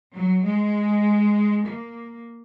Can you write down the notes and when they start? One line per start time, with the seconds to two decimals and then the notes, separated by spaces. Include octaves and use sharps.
0.15 F#3
0.44 G#3
1.66 A#3